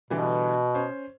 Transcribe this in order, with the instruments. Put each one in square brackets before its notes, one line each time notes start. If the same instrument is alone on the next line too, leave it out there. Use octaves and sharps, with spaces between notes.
[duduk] B2 [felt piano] D3 E3 G3
[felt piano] C#4 C5